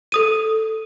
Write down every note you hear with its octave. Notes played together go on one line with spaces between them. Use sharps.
A4 D#6 D#7